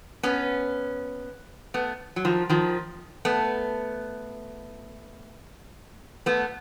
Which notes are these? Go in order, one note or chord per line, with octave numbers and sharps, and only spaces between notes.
B3 C#4
A3 B3
F#3
D#3 F3
D#3 F3
A3 B3
A3 B3